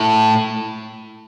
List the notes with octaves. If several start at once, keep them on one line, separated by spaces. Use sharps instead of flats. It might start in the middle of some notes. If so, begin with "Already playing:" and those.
Already playing: A2